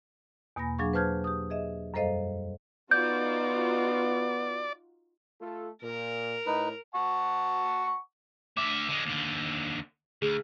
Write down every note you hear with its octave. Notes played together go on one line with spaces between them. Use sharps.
E2 B2 A#3 G#5 B5 A#6
F#3 D4 G#4 F5 C#6
B4 C5 A5 F6 G6 G#6
G4 D#6
G#4 D#5 E5
F#2 G3 A4 C5 D#5 F5
B3 D#4 F4 F#4 D5 G6
A3 F4 A4
A#2 A#4
A2 D#4 B4
F#5 A5 C#6
D2 E5 D6
D3 G#3
D#2 D3
D2 G#4